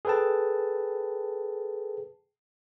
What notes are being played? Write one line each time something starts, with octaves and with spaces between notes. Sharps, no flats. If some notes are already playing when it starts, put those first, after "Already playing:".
G#4 A4 B4 G5 A5